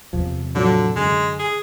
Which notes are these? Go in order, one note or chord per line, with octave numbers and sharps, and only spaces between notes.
E2 C3 F3
A2 D3 F3 F#3
F#2 D3 G#3
G#4